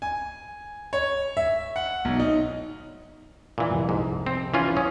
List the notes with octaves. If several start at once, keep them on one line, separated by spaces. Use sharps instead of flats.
G#5
C#5
E5
F#5
B1
D#4
A#2 E3
C2 F2
G#2
C4
E3 C#4 F4
C#4 G#5 D#6